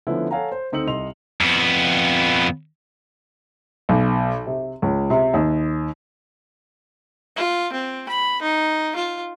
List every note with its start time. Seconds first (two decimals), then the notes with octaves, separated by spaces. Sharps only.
0.07 D3 F3 A3 B3 C#4 E4
0.31 A4 C#5 F5 F#5 G#5 A#5
0.52 C5
0.72 D2 C4 D#4 E6 C#7 F#7
0.87 C2 D#5 C6 F7
1.41 F2 B3
3.89 B1
4.47 C3
4.82 C#2
5.10 C3
5.34 D#2
7.36 F4
7.72 C4
8.09 B5
8.42 D#4
8.96 F4